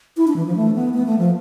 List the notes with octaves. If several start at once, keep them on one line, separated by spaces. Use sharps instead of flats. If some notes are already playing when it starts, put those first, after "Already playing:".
E4
D4
E3
F3
A3
B3
B3
A3
F3